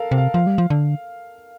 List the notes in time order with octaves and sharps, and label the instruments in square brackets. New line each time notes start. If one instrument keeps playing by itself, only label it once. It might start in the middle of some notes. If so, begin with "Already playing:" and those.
Already playing: [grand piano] A4 A#4 F5
[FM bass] C3
[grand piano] F5
[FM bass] F3 [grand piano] F5
[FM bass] G3
F3
D3